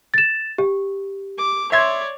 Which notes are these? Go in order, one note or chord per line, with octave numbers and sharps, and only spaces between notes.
A6 E7
G4
D6
C#5 D5 E5 C6 G#6